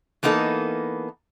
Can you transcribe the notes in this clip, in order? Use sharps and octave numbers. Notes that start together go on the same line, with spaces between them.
E3 A#3 B3 D#4 A4